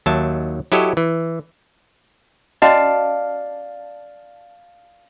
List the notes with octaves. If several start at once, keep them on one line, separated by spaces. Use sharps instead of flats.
D#2 D#3 F#3 E5 A5
F#3 E4 G4 A4 C#5 D#5
E3
C#4 F#4 D5 D#5 F5 A5